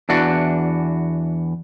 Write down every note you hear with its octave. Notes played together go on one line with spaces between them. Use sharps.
E2 E3 D4 F#4